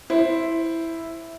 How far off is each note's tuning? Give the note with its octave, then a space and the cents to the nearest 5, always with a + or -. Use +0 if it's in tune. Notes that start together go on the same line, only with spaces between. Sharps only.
E4 +0 C5 +0